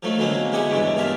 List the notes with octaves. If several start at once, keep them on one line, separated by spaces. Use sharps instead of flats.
F3 F#3 A3 D#4
B2 D3 F#3 G#3 A#3 C4
G#3 E4 G4 G#4 F#5 G#5
E2 G2 C#3 G#3 E4
G2 A#2 F4 G4 E5